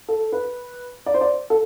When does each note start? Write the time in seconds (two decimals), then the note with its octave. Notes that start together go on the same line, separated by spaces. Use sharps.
0.08 A4
0.32 B4
1.06 D5
1.14 C5
1.21 D5
1.50 A4